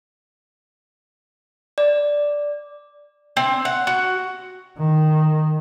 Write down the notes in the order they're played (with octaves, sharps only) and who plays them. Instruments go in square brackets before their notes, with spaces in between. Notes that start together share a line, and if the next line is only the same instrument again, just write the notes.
[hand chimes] D5
[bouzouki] C4
F#5
F#4
[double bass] D#3